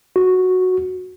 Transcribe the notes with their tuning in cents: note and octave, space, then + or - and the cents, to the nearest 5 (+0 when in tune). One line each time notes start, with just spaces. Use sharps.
F#4 -5